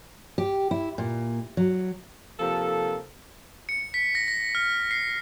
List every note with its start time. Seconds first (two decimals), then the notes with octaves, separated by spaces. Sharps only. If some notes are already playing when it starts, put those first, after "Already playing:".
0.38 G4
0.71 E4
0.98 A#2
1.57 F#3
2.40 C3 F3 A#3 A4
3.69 C#7
3.94 B6
4.15 A#6
4.28 A#6
4.55 F6
4.91 C7